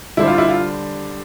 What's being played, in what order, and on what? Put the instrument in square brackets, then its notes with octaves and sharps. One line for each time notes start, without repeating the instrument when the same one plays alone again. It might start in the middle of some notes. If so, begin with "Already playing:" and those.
[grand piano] D3 G3 D4 G4 C5 [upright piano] E4
[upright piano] F4
E4
F4